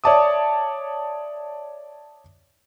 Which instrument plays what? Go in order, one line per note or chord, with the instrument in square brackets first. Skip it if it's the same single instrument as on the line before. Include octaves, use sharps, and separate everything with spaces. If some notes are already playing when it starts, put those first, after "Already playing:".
[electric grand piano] C#5 D5 E5 A5 D6 D#6